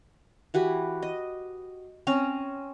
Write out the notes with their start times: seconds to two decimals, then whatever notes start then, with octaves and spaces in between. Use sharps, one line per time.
0.54 E3 F#4 G4 B4
1.02 D#5
2.07 C4 C#4 A#5